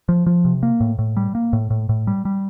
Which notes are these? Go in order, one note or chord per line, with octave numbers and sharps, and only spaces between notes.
F3
F3
C3
A#3
A2
A2
G3
A#3
A2
A2
A2
G3
G3